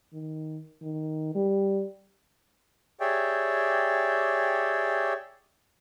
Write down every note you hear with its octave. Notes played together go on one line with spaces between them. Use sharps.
D#3
D#3
G3
G4 G#4 C#5 D5 E5 G5